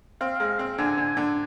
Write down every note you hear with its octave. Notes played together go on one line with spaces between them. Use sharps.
C4 F5
G#3
C4
D3 G#5
D3
D3